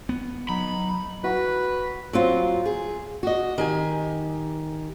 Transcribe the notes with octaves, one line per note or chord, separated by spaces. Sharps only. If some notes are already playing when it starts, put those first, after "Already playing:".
B3
F#3 D#4 B5
F#4 B4
F#3 C4 F4
G#4
F#4 D#5
D#3 G4 G#5